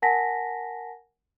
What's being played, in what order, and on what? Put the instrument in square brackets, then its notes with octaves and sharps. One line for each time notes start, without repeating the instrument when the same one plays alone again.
[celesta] A#4 F#5 G#5 A5 A#6 B6